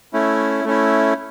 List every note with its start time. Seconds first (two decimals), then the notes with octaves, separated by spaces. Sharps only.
0.13 A3 C#4 E4
0.65 A3 C#4 E4